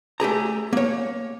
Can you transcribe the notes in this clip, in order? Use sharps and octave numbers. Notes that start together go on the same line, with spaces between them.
A3 G4 G#4 A#5
A#3 C#5